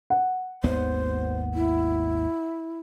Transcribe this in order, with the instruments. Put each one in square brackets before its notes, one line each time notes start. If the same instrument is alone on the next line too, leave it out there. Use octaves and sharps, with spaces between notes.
[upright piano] F#5
[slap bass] G#1 D#2 B3 [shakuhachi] C5
[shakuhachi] E4